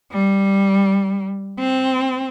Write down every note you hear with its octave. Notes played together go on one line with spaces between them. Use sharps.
G3
C4